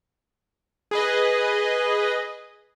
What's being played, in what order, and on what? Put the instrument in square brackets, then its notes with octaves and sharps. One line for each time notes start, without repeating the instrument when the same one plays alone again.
[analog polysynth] G#4 B4 D#5